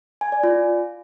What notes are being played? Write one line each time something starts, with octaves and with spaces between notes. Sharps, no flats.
G#5
D5
F4